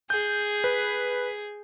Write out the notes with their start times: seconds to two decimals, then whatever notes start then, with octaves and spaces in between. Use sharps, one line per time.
0.10 G#4 G6
0.64 B4